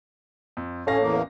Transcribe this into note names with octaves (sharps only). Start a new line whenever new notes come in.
F2
A1 C#4 A4 C#5 F5 A#6
E2 A#3